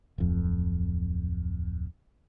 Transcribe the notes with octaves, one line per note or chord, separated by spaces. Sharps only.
D1 F2